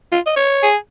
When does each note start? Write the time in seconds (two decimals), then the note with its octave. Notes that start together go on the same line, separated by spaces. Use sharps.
0.12 F4
0.26 D#5
0.36 C#5
0.63 G#4